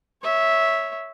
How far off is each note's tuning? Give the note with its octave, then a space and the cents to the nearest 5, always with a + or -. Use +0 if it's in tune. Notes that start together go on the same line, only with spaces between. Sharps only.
C#5 +0 E5 -10